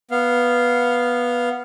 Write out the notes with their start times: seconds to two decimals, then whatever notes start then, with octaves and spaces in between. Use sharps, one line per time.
0.11 B3 F5